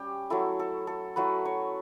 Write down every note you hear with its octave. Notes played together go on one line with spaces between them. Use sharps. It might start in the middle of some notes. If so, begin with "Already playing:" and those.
Already playing: G3 C#4 G4
F#3 A3 E4 A4
A4
A4
F#3 A3 E4 B4
C#5